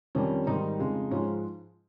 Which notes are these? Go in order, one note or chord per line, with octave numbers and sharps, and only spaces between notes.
F2 D#3 G3 C#4
G#2 D#3 G3 D#4
F2 C#3 G#3
G#2 F3 G#3 C#4